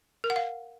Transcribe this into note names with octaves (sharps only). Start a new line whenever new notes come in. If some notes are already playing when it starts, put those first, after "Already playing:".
A#4
F#5
F5